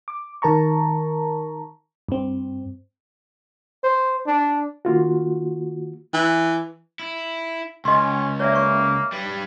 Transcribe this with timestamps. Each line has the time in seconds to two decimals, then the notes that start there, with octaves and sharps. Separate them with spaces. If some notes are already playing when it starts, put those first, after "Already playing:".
0.08 D6
0.42 D#3 A#4 A5 A#5 C#6
2.09 G2 C4
3.83 C5
4.26 D4
4.85 D#3 A#3 F4 F#4
6.14 E3
6.99 E4
7.85 C#2 C#4 D#5 C6
8.40 A#3 C#5 D5 E5
8.52 C#5 C#6
9.12 G3 B4